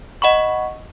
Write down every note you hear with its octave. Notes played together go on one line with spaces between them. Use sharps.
D#5 F#5 B5 C#6